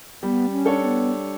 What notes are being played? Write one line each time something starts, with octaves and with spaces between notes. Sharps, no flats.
G3 B3
C#4
D4 A4 C#5
C#4
B3